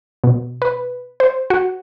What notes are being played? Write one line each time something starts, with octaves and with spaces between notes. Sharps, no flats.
B2
B4
C5
F#4